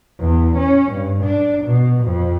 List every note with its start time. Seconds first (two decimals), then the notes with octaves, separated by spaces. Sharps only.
0.19 E2
0.57 C#4
0.92 G2
1.24 D4
1.66 B2
2.04 F2